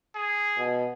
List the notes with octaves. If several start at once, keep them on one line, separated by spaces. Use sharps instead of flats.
G#4
B2